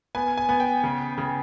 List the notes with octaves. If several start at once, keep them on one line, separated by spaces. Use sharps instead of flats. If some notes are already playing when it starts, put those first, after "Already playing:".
B3 G#5
G#5
B3
G5
C#3
C#3